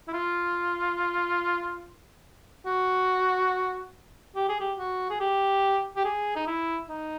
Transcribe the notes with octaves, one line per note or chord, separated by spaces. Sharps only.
E4
F4
F#4
G4
G#4
G4
F#4
G#4
G4
G4
G#4
D#4
E4
D#4